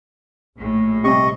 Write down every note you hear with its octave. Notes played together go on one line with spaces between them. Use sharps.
A#1 A2
C3 G3 C4 G4 D#5 C#6